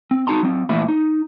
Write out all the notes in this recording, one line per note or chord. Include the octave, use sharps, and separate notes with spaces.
C4
D#4 F#4 A5 A#5 C6
F#3 C4
A#2 E3 A3 E5 B5
D#4